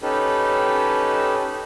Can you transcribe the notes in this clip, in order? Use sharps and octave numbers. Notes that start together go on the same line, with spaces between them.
C#4 D#4 G4 A4 B4